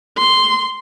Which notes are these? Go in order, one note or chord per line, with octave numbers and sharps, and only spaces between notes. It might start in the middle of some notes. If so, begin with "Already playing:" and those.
C6